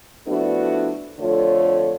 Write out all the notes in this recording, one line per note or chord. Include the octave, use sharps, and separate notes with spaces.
F3 A3 B3 D4 E4 F#4
F2 D3 A3 F4 C#5